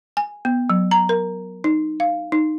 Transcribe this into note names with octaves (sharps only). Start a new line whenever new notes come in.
G#5
B3
F#3
A#5
A#4
D#4
F5
D#4